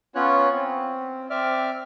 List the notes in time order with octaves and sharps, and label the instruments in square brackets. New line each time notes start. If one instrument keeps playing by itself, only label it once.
[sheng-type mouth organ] B3 C#4 F4 C#5 F#6
C4
C4 D5 E5 D6 F6